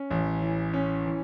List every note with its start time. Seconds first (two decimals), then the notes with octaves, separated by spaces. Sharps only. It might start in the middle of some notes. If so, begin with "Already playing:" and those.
Already playing: C#4
0.10 A1
0.42 E3
0.73 C#4
1.05 E3